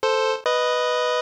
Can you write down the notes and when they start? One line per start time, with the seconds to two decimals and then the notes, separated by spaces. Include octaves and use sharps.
0.03 A4 C5
0.46 B4 D#5